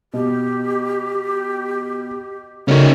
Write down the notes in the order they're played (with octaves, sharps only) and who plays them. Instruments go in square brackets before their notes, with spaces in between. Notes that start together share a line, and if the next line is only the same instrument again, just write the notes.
[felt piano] B2 [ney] G4
[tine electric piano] C#3 F#4 C#6 [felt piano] A3 [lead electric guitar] C#4 D#4 [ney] A#4